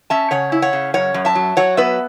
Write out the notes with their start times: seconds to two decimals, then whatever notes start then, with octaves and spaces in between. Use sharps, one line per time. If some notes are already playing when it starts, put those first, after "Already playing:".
0.10 C#4 E5 A5
0.31 C#3 C#5 F#5
0.52 E4
0.62 C#5 F#5
0.73 C#3
0.94 F#2 C#5 F#5
1.14 F#2
1.25 E5 A5
1.35 F#3
1.57 F#3 C#5 F#5
1.77 B3 B4 E5